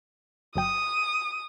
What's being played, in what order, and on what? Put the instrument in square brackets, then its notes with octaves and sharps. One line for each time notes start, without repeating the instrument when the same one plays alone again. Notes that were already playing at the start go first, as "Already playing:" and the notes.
[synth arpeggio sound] G1 F#3 G5 [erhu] D#6